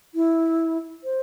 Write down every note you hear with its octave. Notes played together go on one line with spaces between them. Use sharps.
E4
C5